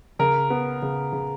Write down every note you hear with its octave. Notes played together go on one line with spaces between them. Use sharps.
C#3 A#4
B3
C#3
C#3